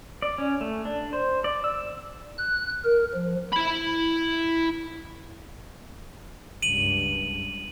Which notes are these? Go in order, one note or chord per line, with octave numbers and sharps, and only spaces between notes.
D5
C#4
A3
D4
C5
D5
E6
F#6
A#4
F3
E4 B5
C#2 G2 D#7 F#7